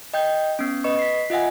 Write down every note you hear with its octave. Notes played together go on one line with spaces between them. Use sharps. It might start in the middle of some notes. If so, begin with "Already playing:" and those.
D#5 G5 G6
B3 C#4
B4 D#5 C#6
B6 C7
F4 D#5 E5 F#5 G#5